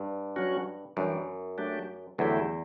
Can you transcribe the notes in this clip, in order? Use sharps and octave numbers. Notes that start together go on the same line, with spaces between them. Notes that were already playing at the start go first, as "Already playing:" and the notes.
Already playing: G2
F#3 C#4 F#4
F#2 E3 G3 D4
F#3 A3 D4 G4
E2 D3 F#3 A3 E4 G4